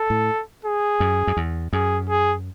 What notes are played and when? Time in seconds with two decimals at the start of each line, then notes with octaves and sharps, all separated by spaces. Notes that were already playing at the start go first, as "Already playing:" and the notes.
Already playing: A4
0.10 A2
0.65 G#4
1.00 F#2
1.27 F#2
1.37 E2
1.73 F#2 G#4
2.09 G#4